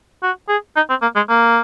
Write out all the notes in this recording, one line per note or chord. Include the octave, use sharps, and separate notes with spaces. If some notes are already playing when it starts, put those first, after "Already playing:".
F#4
G#4
D#4
C4
A#3
G#3
A#3